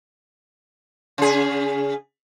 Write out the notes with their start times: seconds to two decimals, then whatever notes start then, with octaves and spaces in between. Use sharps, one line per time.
1.18 C#3 G#4